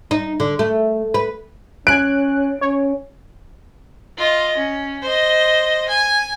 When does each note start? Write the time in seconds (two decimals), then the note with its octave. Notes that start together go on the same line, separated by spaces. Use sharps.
0.11 D#4
0.40 D3
0.59 A3
1.14 B4
1.87 C#4 G#5 F#6 D7
2.61 C#4 C#5
4.18 F4 D#5
4.56 C#4
5.02 C5 D#5
5.89 G#5